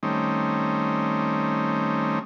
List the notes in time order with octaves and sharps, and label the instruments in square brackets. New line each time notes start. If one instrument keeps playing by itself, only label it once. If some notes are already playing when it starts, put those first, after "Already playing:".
[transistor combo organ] D#3 G3 A3 C4 C#4 D#4